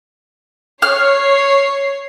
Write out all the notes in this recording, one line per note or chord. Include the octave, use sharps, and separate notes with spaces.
C#5 F6 C7